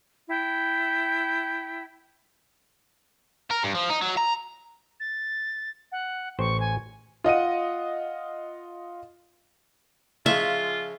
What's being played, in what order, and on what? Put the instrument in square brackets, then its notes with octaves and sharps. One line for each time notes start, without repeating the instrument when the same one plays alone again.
[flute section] E4 G5
[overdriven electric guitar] A#4
G2
F3
D#4
F#3
A#5
[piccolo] A6
F#5
[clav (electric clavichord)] A1 C5 G5 [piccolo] C#6
[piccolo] G#5
[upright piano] F4 D#5 F#5 D#7
[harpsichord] C#3 F3 G#3 [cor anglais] F4 [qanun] E5